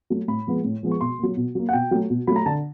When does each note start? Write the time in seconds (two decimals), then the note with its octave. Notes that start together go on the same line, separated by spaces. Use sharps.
0.10 F#3 A3
0.28 A2 B5
0.47 F3 G#3 B3
0.64 A2
0.83 F3 G#3 B3
0.91 C#6
1.01 B2 C6
1.19 F#3 A#3
1.37 B2
1.55 F#3 A#3
1.69 F#5
1.73 B2 G5
1.91 F#3 A3
2.10 B2
2.27 F#3 A3 B5
2.36 A#5
2.46 D3 A5